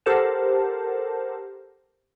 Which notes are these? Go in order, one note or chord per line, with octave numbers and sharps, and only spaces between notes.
G4 A4 A#4 C5 F#5 A5